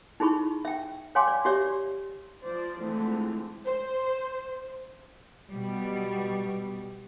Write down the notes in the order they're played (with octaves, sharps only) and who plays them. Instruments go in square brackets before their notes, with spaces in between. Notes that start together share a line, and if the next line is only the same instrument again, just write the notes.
[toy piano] D#4 E4 G#4 B5 C#6
E5 G5
C#5 F5 G5 G#5 C6 D6
D5
F#4 G4 C#5 D5 E5
[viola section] F3 C5 D5
D3 E3 F3 G#3 A3 C4
[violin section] C5
[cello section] B2 G3